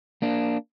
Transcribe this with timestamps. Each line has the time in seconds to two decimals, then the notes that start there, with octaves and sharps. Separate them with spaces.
0.22 A#3 D4